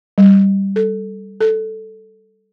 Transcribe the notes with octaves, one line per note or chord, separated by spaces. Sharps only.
G3
A4
A4